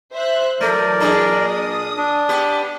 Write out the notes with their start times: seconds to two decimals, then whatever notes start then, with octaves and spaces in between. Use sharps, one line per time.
0.12 C5 E5 F#6
0.61 E3 F#3 A3 A#4 D5
1.00 A#2 D4 G#4
1.45 D#6
1.97 D4
2.29 B3 G4